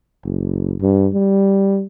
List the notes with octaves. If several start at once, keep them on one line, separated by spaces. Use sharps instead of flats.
F#1
G2
G3